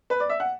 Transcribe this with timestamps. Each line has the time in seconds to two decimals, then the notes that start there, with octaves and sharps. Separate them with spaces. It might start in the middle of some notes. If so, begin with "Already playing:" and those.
0.10 B4
0.20 D5
0.29 E5
0.40 F#5